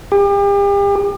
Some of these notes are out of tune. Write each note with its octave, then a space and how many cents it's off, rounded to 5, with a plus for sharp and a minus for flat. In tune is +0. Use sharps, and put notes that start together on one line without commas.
G4 +40